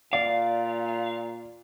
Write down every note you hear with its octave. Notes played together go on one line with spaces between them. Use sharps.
A#2 D5 F5